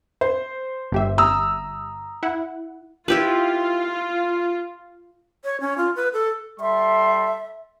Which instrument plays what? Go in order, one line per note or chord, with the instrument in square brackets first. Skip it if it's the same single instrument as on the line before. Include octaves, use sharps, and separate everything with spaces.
[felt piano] C5
[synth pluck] G1 G4 E5
[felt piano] A#5 D#6 E6
[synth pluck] E4 F#5
[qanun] E4 G4 B4 [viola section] F4
[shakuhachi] C#5
C#4
F4
B4
A4
[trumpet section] G3 A4 C6 [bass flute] E5